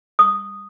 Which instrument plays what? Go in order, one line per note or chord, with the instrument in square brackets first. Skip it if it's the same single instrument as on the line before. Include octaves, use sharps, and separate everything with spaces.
[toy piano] D#6